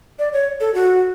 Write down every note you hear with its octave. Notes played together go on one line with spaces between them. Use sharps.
D5
C#5
A4
F#4